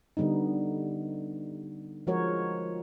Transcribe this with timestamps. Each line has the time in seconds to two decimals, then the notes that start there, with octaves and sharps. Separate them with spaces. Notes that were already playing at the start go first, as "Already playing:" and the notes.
0.17 D3 G3 B3 D#4
2.07 F3 G#3 F#4 A#4 C#5